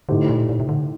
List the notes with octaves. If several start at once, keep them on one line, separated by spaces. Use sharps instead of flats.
A2 D3 A3 D#4 G4 C5
A#2
A#2
C3
D3